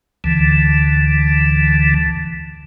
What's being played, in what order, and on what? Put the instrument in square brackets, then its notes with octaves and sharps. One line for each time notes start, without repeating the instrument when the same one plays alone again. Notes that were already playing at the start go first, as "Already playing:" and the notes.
[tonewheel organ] D2 D3 E3